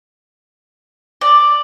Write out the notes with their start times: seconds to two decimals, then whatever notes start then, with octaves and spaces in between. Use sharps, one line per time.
1.21 D5